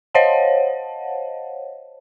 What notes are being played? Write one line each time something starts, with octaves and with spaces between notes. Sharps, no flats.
C5 C#5 D#5 F5 F#5 A5